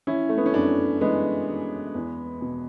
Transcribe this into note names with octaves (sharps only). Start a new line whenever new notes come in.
E3 C#4 E4
A3
B3
C#4
F#2 B3 D4
E3 G#3 B3
E3
E2
B2